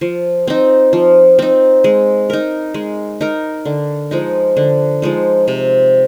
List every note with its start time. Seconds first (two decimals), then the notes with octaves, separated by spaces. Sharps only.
0.01 F3
0.48 C4 D#4
0.93 F3
1.39 C4 D#4
1.84 G#3
2.30 D#4 A#4
2.74 G#3
3.21 D#4 A#4
3.65 D3
4.11 F3 G#3 D#4
4.57 D3
5.02 F3 G#3 D#4
5.48 C3